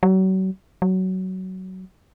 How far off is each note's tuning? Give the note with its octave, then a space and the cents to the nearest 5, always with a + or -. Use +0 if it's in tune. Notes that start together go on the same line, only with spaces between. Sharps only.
F#3 +35
F#3 +15